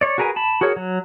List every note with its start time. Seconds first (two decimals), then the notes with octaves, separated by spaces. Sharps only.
0.01 C#5 D5
0.18 F#4 G#4 A#4 B4 G#5
0.36 A5 B5
0.61 F#4 G#4 A#4 C#5
0.77 F#3